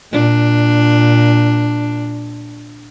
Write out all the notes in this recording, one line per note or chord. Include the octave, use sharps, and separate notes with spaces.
A#2 D4